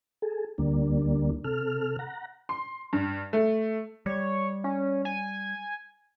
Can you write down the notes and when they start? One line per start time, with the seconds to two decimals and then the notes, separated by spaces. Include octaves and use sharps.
0.22 G#4 A4
0.58 D2 D3 G3 A#3 D4
1.44 C3 A4 F6
1.99 F#5 A#5
2.49 C6
2.93 G2
3.33 A3
4.06 G3 C#5
4.64 C#4
5.05 G#5